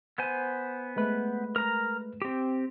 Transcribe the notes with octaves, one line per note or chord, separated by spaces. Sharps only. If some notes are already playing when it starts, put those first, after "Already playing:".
B3 C5 G#5
G#3 A3 B4
A#4 A#5
C4 G4